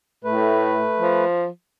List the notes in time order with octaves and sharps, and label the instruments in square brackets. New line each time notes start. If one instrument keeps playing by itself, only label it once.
[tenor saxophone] A2 [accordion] A3 B4
[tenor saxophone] F3